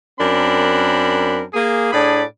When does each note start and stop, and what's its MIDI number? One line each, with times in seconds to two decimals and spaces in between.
0.20 1.43 42
0.20 1.43 60
0.20 1.43 62
0.20 1.43 70
0.20 1.43 83
1.54 1.92 58
1.54 1.92 68
1.92 2.23 45
1.92 2.23 62
1.92 2.23 68
1.92 2.23 74
1.92 2.23 83